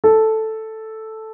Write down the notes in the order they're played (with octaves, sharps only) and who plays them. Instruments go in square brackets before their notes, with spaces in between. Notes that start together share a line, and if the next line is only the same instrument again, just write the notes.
[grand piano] A4